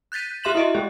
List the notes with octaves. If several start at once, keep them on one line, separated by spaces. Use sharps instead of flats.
F#6 G6 A6 B6 D#7
F#4 G4 E5 C6 E7 F#7
E4 F#4 D#5 E5
G#3 G4 G#4